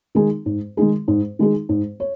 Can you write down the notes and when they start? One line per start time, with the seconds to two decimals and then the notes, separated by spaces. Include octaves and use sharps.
0.15 D#3 G#3 D#4 G#4
0.46 G#2
0.77 D#3 G#3 D#4 G#4
1.08 G#2
1.39 D#3 G#3 D#4 G#4
1.69 G#2
2.00 C#5